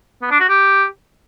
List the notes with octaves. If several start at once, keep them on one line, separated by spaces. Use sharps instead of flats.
B3
D4
F#4
G4